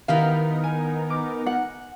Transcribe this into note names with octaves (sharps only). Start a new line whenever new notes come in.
D#3 B3 D#4 E4 G4 A#4 F5
G#5
D6
F#5